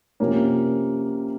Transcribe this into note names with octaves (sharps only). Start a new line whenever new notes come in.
C3 F3 A#3 C#4